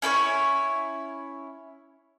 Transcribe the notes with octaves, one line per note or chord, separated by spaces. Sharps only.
C#4 E4 A4 C#5